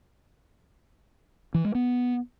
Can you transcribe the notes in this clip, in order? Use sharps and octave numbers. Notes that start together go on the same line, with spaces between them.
E3
G#3
B3